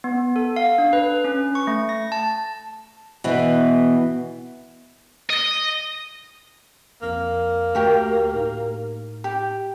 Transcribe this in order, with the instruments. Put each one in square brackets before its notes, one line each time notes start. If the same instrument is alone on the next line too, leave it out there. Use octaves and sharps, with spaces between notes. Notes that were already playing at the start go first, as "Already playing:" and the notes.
[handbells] B3
A4
F5
D4
B4
C#4
C#6
A3
A#6
A5
[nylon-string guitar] B2 E3
[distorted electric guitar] D#5
[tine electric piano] A#1 F2 [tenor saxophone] A#3
[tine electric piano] D2 A3 [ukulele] F#4 G4 A#4
[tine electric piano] A2 D#4
[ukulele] G4